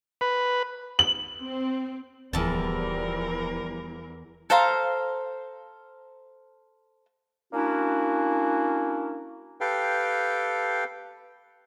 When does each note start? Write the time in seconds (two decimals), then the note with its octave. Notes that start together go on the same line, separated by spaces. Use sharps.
0.21 B4
0.99 F#7
1.41 C4
2.33 D1 E2 E3 F3 G3 A#4 A5
4.50 A4 C5 F5 A#5
7.53 A#3 C#4 D4 E4 F#4
9.61 G4 A4 B4 F5 G5